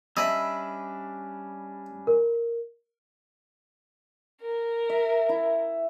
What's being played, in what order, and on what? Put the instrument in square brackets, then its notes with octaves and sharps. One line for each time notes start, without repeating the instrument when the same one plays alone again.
[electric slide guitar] G3 C#4 D4 [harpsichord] D#5 E5 [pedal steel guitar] B5 E6
[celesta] A#4
[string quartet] A#4
[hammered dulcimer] E5
E4